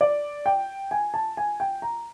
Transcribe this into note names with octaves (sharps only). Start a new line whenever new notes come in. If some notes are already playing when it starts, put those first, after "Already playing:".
D5
G5
G#5
A5
G#5
G5
A#5